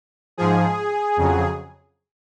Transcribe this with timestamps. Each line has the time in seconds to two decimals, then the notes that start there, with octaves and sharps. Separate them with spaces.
0.38 G#2 F3 G#4
1.17 F2 C#3 F#3